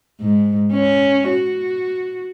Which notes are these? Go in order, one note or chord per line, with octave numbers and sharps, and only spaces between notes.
G#2
C#4
F#4